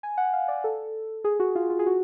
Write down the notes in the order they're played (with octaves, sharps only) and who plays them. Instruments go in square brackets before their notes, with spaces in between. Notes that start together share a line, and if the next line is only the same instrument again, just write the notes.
[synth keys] G#5
F#5
F5
D5
A4
G#4
F#4
F4
F4
G#4
F#4